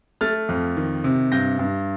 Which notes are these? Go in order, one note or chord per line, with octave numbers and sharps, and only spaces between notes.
A3 F6 A6
F2
D#3
C3
G2 G6 A#6
G2